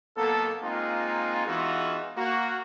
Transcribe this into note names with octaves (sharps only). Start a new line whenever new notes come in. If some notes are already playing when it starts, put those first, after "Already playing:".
B1 A#3 B3 A4
G#3 A#3 C4 D#4 F4
E3 G#3 B3 D#4 F4 F#4
A#3 F#4